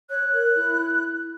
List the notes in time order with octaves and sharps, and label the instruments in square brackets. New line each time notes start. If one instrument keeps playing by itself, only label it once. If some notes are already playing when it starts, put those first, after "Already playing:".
[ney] C#5 [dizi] F#6
[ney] A#4
E4